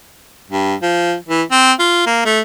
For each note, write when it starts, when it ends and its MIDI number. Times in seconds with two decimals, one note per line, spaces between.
0.50 0.74 43
0.82 1.15 53
1.29 1.43 52
1.51 1.73 60
1.79 2.02 65
2.06 2.24 58
2.25 2.41 57